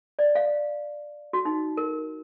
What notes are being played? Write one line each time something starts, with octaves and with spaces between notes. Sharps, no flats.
D5
F5
F#4
D#4
A#4